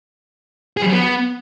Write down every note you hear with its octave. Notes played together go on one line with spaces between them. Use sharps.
G#4
G3
F#3
B3